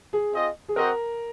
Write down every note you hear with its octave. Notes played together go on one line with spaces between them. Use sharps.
G#4
C4 F4 G#4 D#5
G#4
C4 F#4 A#4 C5 D#5 F#5